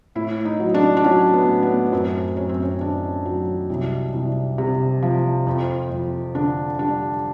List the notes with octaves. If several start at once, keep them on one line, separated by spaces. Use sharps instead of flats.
A2 E4
D#4
F#3
D4
D4
F#3 C#4
B3
A2
B3
F#2 C4
F#2 C#4
C4
C#4
D#3 D4
F#3
C2
C2
C3
F3
F2
F2
D3 D4
G3 D4